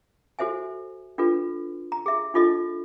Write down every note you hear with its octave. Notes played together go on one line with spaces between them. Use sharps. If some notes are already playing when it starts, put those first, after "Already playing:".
F#4 A4 C5 E5 G#5
D4 F4 A4 B4
A#5
G#4 E5
D4 D#4 F4 A4 D#5